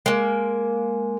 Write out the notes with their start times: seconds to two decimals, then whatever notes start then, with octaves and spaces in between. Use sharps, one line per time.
0.06 G#3 A#3